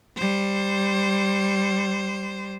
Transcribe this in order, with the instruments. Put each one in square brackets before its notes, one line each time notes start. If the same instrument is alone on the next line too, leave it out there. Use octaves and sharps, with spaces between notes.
[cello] G3 C5